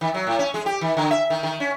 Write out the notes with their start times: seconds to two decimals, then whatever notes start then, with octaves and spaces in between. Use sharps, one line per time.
0.01 D#3
0.14 F#3
0.27 A2
0.39 C#4
0.54 G#3
0.66 G4
0.81 D#3
0.97 D3
1.11 E5
1.30 D#3
1.43 D#3
1.60 C#4